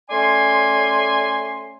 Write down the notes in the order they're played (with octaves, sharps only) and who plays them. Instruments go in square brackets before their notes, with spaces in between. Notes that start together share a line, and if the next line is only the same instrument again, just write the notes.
[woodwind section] A3 C#4 D5 G#5 C6